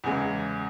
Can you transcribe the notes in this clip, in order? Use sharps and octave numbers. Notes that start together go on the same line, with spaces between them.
E2 C#3 E3 G#3